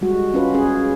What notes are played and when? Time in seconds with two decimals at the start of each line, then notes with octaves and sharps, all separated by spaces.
0.01 G3 G#3 F#4
0.34 C#4 F4 B4
0.54 C#4 G#4